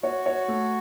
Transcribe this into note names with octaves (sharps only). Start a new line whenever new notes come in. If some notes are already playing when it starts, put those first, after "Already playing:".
F#4 C#5
C#5
A3